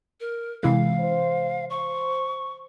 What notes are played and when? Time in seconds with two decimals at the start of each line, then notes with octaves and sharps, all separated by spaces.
0.20 A#4
0.63 C3 E3 G#3 F5
0.98 C5
1.70 C5 C#6